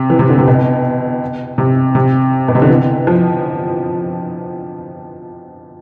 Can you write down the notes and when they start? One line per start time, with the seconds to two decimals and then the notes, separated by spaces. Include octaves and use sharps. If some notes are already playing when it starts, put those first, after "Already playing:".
Already playing: C3
0.10 E3
0.19 C3
0.29 D3
0.38 C3
0.48 B2
1.58 C3
1.95 C3
2.48 B2
2.55 C3
2.62 D3
2.69 E3
3.07 F3